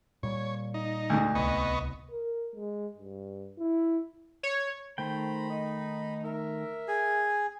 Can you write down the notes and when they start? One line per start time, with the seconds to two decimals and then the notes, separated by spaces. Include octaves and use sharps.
0.23 A#2 G3 C#5
0.74 D#4
1.10 D2 G#2
1.35 D1 C2 B3 D#5 C#6
2.11 A#4
2.55 G#3
2.98 G2
3.59 E4
4.43 C#5
4.98 D#3 A3 C5 G5 A#5 B5
5.50 D#4
6.24 A#4 E5
6.88 G#4 G#5